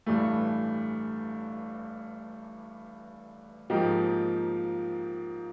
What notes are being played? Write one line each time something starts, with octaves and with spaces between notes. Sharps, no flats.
A1 G2 E3 A3
G#2 F3 A#3 D#4 G4